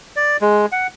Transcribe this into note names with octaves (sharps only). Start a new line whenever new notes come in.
D5
G#3
F#5